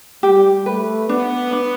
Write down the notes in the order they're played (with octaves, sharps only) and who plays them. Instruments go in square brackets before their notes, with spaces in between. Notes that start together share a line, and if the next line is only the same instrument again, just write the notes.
[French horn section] G3 [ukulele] G4
[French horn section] A3 [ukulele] B4
[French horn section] B3 [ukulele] D4
[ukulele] D4